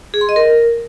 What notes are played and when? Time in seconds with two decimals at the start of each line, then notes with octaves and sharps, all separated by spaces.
0.14 G#4
0.21 C6
0.29 D#5
0.36 A#4